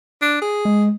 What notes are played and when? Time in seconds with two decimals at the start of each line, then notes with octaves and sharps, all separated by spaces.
0.22 D4
0.42 G#4
0.65 G#3